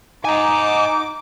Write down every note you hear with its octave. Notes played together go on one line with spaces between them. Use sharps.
D#4 G#5 A#5 D6